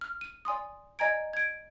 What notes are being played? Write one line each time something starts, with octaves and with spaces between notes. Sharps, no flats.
F6
D#7
D5 G#5 C6 D#6
D5 D#5 G#5 A#5 G#6 D7
G#6 D7